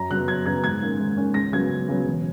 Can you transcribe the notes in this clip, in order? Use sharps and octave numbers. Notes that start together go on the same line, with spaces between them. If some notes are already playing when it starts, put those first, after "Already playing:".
Already playing: F#2 A#5
C#3 F#3 B3 F#6
F#2 G#6
C#3 F#3 B3 G#6
G#2 G#6
D#3 A#3 C#4
G#2
D#3 A#3 C#4
C#2 A#6
C#3 F#3 B3 G#6
C#2
C#3 F#3 B3
E1